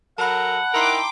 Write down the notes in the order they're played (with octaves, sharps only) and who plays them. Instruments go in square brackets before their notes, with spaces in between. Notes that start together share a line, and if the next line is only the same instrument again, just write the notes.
[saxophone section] F#3 A4 A#4 [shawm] F#5 [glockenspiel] A5 B5
[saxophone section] D#4 E4 A#4 [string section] G5 D6 [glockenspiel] A#5 C6 C7